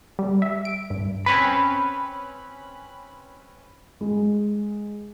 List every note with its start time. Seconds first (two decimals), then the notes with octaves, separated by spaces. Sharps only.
0.19 G3
0.42 E5
0.65 D7
0.90 G2
1.26 C4 C#4 B4 B5
4.01 G#3